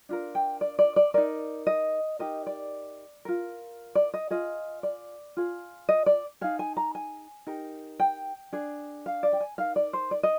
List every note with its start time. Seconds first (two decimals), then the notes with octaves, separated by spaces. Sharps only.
0.09 D4 F4 A#4
0.35 G5
0.61 D5
0.79 D5
0.96 D5
1.14 D#4 A#4 D5
1.67 D#5
2.19 D#4 G4 A#4 D#5
2.47 D5
3.25 F4 A#4
3.95 D5
4.14 D#5
4.30 F4 G#4 D#5
4.83 D5
5.37 F4 G#4
5.89 D#5
6.06 D5
6.41 D#4 G#4 F5
6.59 G#5
6.77 A#5
6.95 G#5
7.47 D#4 G4 A#4
8.00 G5
8.52 D4 G#4
9.06 F5
9.23 D5
9.33 G5
9.40 G#5
9.58 D#4 A#4 F5
9.76 D5
9.93 C5
10.11 D5
10.23 D#5